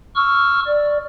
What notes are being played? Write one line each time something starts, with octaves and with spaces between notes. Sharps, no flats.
C#6 E6 F6
D5